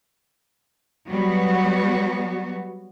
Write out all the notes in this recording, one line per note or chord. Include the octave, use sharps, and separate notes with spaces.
F#3 G3 B3 F#4